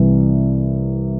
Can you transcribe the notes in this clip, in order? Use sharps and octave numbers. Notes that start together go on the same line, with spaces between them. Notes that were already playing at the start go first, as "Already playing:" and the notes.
Already playing: C2 C3 E3